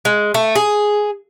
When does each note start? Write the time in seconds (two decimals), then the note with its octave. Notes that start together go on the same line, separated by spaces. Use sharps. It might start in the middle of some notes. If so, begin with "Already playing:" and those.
0.05 G#3
0.34 A3
0.55 G#4